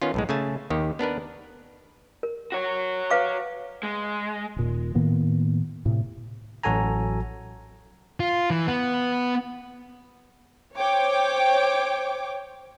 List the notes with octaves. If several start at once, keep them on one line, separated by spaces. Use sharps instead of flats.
D#3 B3 C#4 F4
B1 A2 G#3
C#3 A3 G#5 A5
D#2 D#3 G4
B3 D4 A#4 B4
A#4
F#4 C#5
B4 F5 D6
G#3
D#1 A#2
A2 D#3 A#3 B3
A2 C3
A1 F#3 F#4 A4 G#5 A#5
F4
E3
B3
C5 C#5 G5 D6